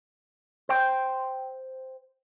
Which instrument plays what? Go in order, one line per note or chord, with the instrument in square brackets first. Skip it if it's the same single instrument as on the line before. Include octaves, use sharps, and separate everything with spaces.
[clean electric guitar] C5 G5